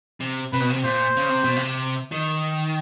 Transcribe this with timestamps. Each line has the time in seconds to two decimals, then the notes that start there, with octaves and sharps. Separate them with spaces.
0.20 C3
0.53 C3 B4
0.60 B2
0.69 C3
0.84 A#2 C5
1.16 C#3
1.29 C3
1.44 B2
1.57 C3
2.12 D#3